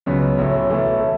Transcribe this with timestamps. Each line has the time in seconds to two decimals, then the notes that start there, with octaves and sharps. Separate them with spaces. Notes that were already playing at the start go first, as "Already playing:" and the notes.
0.06 C#2 C#3 F#3 B3
0.38 A1 A2 F#3
0.70 B1 A2 E3 A3
1.01 A3